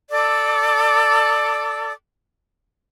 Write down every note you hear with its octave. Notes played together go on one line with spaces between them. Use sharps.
A4 D5 D6 E6